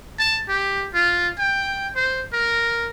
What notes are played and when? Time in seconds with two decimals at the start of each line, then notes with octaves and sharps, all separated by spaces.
0.19 A5
0.49 G4
0.94 F4
1.39 G5
1.95 C5
2.33 A#4